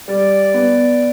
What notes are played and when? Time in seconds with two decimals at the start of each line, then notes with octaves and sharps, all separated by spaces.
0.08 G3 D5
0.54 B3